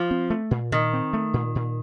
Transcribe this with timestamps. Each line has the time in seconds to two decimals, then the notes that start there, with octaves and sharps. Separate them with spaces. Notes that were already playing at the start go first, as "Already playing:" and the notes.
Already playing: F3
0.11 C4
0.30 A3
0.51 A#2
0.72 A#2 D#3
0.93 C4
1.13 A3
1.34 A#2
1.55 A#2